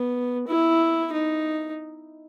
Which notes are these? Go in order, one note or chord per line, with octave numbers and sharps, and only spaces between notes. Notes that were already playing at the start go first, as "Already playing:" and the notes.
Already playing: B3
E4
D#4